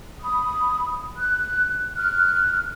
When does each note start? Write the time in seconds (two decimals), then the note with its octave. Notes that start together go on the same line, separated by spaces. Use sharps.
0.20 B5 D#6
1.17 F#6
1.97 F6 F#6